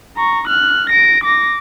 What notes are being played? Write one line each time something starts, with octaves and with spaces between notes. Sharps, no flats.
A#5 C#6
F6 F#6
A#6 D7
D6 A#6